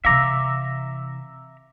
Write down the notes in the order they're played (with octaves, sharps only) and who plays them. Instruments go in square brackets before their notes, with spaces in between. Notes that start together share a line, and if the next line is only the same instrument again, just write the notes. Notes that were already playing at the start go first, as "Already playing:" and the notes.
[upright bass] C3 E3 [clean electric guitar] E5 A#5 [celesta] F5 D6 E6